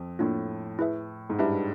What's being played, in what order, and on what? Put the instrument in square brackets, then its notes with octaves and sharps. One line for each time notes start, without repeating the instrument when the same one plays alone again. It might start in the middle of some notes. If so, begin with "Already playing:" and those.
Already playing: [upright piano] F2
[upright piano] A2 [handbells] A#3 D4 F4
[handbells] E4 G#4 B4 E5
[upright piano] G#2
[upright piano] G2 [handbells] E4 G4 B4 E5